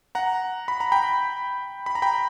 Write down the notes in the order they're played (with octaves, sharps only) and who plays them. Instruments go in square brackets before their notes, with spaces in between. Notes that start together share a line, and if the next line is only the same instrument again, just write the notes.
[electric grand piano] F#5 A#5
B5
A#5
G5 B5
B5
A#5
G5 B5